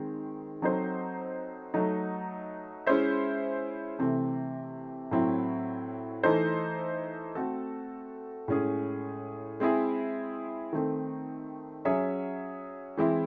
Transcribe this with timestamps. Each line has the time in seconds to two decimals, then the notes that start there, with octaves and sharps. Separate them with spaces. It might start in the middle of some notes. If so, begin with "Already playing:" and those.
Already playing: D#3 G#3 C4
0.62 F#3 C4 D#4 A4 C5
1.74 F#3 A3 D#4
2.87 G#3 C#4 E4 C5 E5
3.99 C3 E3 A3 C4
5.11 A2 F#3 C4 E4
6.23 E3 A3 D#4 A4 C5
7.35 A3 C4 F#4 A4
8.48 A2 G#3 C#4 G#4
9.60 G#3 C4 E4 G#4
10.73 D#3 A3 C4
11.85 F#3 C#4 G#4 C#5 E5
12.97 E3 G#3 C4 E4